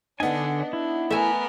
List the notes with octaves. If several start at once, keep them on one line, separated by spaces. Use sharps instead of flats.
D3 B3 D4 D#4 G#5
D4 E4
A3 B3 A#4 E5 G#5